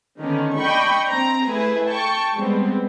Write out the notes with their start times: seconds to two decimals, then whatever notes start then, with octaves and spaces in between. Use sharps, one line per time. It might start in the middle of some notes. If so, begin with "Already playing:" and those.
0.20 D3 D#3 B3 C#4
0.56 D4 D#5 G5 B5 C#6
1.07 C4 A#5
1.46 A3 E4 G#4 B4
1.89 G5 A5 C#6
2.35 G3 G#3 B3 C4